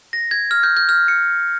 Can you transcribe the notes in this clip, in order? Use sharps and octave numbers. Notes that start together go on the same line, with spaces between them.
A#6
G#6
F6
G6
G6
F6
C#7